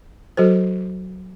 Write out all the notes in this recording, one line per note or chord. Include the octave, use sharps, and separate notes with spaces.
F#3 F#4 A4 C5